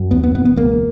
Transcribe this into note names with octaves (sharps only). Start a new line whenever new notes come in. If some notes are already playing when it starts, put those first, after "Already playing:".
Already playing: F#2
D#2 B3
B3
E1 B3
B3
C#2 A#3